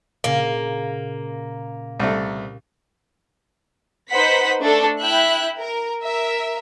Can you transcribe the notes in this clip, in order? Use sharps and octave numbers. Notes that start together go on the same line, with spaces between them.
A#2 C#3 A#3 C#4
C2 A3
D#4 B4 C5 F#5 B6
A3 D4 A4
E4 E5 G5 F#6
A#4
A#4 E5